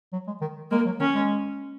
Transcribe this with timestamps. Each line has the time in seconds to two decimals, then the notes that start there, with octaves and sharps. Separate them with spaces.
0.13 F#3
0.27 G#3
0.41 D#3
0.71 G#3 A#3
0.86 F#3
1.00 D#3 C#4
1.15 G#3